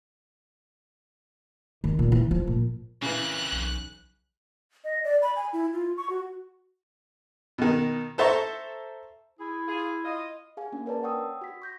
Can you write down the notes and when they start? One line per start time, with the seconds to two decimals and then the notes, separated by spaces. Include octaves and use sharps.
1.84 D#3
1.99 A#2
2.12 E3
2.31 F3
2.47 A#2
3.02 F2 C#3 E3 A#3 F#6
3.52 B1
4.84 D#5
5.04 D5
5.22 B5
5.36 G#5
5.53 E4
5.74 F4
5.97 C#6
6.10 F#4
7.58 B2 D#3
8.18 A4 C5 E5 A5 A#5 C#6
9.39 E4 G#4
9.68 F4 G#4
10.05 F4 D#5
10.57 G#4 F5 G#5
10.72 A#3 C#4 D4 F#4
10.86 A#4 B4 C#5 D5 A5
11.03 F#5 G5 C#6 D#6 E6
11.42 F#4 B6
11.62 C#6 G6 A#6